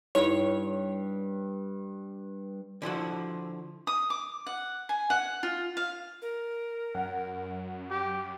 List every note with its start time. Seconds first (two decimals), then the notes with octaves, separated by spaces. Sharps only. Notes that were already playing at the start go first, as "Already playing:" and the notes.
0.15 G2 D#4 E4 C#5
2.82 D3 F3 E4 F#4
3.87 D#6
4.10 D6
4.47 F#5
4.89 G#5
5.10 F#5
5.43 F4
5.77 F5
6.22 A#4
6.95 F#2 F#5
7.90 G4